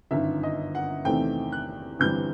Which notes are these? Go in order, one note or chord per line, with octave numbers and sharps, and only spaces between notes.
G1 F#2 D#3 E5
D#5
F#5
E2 C3 D#3 A3 C4 G5
F#6
G1 G2 E3 G3 C4 G6